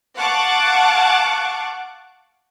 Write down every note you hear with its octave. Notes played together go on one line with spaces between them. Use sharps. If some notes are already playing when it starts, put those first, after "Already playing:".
F5 F#5 A5 C#6 D6 F#6